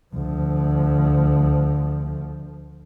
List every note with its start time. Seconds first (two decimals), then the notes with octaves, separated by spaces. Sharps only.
0.14 D2 F3